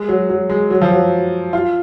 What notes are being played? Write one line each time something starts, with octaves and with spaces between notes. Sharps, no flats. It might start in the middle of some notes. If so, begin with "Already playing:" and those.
Already playing: G#3
F#3
F#3
G#3
F#3
F3
F#3
F4